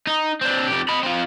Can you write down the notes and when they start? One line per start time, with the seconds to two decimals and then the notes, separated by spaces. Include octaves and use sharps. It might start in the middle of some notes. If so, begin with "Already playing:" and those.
0.07 D#4
0.41 C4 D4
0.67 F2 G4
0.89 D#5 B5
1.03 C4 F4